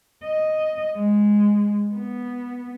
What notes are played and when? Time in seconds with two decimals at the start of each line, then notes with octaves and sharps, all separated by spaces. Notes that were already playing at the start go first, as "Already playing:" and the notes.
0.25 D#5
0.96 G#3
1.94 B3